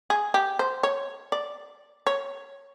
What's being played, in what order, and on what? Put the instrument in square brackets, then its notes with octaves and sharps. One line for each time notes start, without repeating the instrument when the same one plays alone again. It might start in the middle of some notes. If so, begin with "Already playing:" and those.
[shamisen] G#4
G4
C5
C#5
D5
C#5